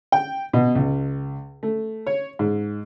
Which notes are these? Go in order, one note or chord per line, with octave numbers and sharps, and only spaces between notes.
G5
B2
C#2
A3
C#5
G#2